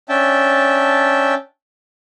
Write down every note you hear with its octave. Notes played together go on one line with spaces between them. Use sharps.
C#4 D4 E5 G5 A5